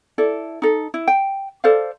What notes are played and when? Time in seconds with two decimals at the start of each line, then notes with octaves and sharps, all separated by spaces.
0.18 E4 A4 D5
0.62 D#4 A4
0.94 E4
1.08 G5
1.64 A4 C5 D5 F5